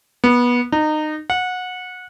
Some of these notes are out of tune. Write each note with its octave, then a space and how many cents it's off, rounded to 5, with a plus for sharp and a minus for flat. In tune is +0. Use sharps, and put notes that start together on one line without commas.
B3 -20
D#4 -25
F#5 -20